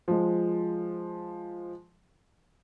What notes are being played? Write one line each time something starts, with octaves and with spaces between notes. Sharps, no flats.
F3 G#3